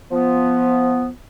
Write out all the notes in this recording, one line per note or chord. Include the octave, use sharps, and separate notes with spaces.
F3 B3